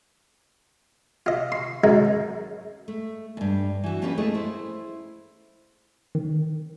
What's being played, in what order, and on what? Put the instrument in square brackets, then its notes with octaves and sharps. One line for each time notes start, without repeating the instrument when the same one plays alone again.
[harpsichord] F4 D#5
C6
F#2 G#3 D#4
[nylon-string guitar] A3
E2 G2
E3 F#4
F3 A#3 C#4 E4 G4 B4
A3 E4 G#4 D#5
E4 C5
[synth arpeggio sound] D#3